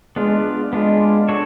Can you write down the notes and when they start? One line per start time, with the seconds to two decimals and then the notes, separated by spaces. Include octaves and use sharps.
0.16 G#3 B3 D4 F4
0.73 G#3 B3 D4 F4
1.29 D4 F#4 A4 C#5